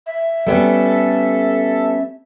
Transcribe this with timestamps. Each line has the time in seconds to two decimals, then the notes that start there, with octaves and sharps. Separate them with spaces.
0.06 E5
0.46 G3 B3 C#4 A4